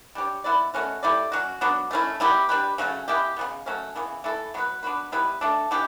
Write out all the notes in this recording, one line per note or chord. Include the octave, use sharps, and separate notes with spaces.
G3 D4 G4 C#5
B3 E4 B4 D5
B2 A3 C#4 F#4
A3 E4 G4 D5
F#3 C#4 F#4
F#3 B3 D4
A3 C#4 E4
G3 B3 E4 G4
G3 D4 G4 B4
C#3 F#3 A3 C#4
E3 B3 E4 G4
C#3 G3 B3
F#3 A3 C#4
C#3 E3 B3
E3 A3 E4 A4
F#3 B3 F#4 B4
B3 D4 F#4 B4
G3 B3 E4 B4
A3 D4 A4
E3 B3 D4 G4